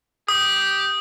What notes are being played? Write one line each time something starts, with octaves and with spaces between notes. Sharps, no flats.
G4 D#6